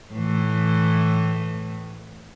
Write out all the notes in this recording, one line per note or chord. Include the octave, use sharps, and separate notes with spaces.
A2 E3